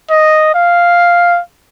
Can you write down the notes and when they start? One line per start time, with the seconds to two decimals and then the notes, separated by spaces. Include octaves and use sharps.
0.10 D#5
0.54 F5